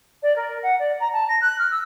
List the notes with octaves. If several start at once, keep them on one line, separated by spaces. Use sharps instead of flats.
D5
A#4
F#5
D5
A#5
A5
A#6
F#6
F6
E6